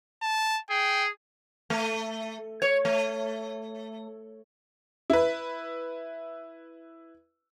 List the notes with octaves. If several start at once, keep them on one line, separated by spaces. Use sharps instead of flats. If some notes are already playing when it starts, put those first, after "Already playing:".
A5
G#4 G5
A3
C#5
A3
E4 B4